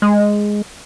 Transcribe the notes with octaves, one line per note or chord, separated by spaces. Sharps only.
G#3